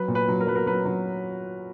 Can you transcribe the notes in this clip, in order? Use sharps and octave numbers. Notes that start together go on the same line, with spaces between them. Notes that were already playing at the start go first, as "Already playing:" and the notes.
Already playing: F#3 B4
A#2
B4
F#3
A#4
F#3 B4
A#4
F#3 B4
F#3